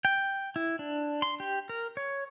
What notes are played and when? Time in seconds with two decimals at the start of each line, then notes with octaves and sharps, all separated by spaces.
0.05 G5
0.56 E4
0.79 D4
1.22 C6
1.40 G4
1.69 A#4
1.97 C#5